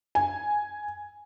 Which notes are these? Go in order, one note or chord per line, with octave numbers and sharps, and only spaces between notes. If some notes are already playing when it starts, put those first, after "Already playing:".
G#5